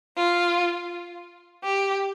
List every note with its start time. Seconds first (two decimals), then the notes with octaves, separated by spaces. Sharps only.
0.17 F4
1.64 G4